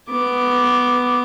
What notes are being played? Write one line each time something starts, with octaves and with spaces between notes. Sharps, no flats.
B3 D6